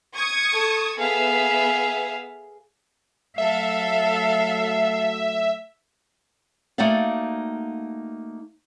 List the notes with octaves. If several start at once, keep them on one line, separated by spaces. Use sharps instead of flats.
C#6 D#6 G#6
A4
B3 G#4 E5 F5
F#3 A3 A4 E5 F5
A3 A#3 D#4 F#4 D5 F5